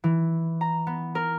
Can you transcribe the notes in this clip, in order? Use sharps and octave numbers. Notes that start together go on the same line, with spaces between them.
E3
A#5
B3
A#4